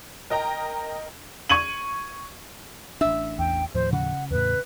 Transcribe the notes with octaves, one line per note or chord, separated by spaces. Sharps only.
A#4 D#5 G5 A#5
C#6 G#6 D#7 F#7
A1 D4 E5
E2 G5
D#2 A2 F3 C5
C#3 F#5
E2 A2 B4